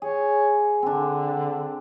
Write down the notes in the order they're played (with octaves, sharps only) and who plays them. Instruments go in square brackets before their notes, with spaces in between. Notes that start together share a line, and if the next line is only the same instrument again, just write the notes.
[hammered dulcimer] G#4 [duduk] C#5
[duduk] D3 [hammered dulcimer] C4 D4